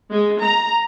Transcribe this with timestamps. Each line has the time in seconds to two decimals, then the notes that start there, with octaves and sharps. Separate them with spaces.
0.11 G#3
0.41 A#5